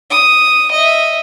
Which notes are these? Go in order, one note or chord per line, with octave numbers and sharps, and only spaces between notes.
D#6
D#5 E5